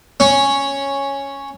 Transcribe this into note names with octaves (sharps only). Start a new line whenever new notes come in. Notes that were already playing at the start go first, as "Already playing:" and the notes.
C#4